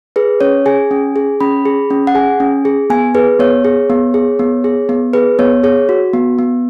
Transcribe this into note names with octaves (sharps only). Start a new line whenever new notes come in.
G#4 B4
C#4 C#5
G#4 G#5
C#4
G#4
C#4 B5
G#4
C#4
F#5
G#4 G#5
C#4
G#4
B3 G#5
G#4 B4
B3 C#5
G#4
B3
G#4
B3
G#4
B3
G#4 B4
B3 C#5
G#4 C#5
F#4
B3
B3